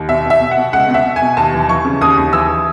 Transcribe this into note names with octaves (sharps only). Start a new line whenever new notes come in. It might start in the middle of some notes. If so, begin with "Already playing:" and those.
Already playing: D#2
B2 E5
B2
E5
B2
F#5
B2
C#2 F#5
B2
E5
B2
G#5
B2
D#2 A5
E3
E3 C#6
C#3
D#2 D#6
D#2
E3 E6